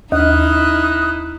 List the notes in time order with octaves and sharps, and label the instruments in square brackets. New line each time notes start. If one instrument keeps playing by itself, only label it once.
[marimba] D#2 [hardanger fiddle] D#4 E4 [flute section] D#6 F6 F#6